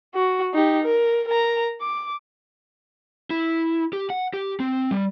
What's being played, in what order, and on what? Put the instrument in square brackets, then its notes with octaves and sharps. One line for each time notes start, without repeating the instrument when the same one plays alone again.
[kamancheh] F#4
D#4 G4
A#4
A#4 A#5
D6
[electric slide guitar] E4
G4
F#5
G4
C4
G3